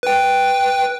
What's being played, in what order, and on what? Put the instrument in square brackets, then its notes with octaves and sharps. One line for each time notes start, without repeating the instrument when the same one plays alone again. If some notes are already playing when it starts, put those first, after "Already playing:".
[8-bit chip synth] B4 G5